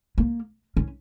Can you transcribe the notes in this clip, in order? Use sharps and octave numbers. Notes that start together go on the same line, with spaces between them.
A#3
C#4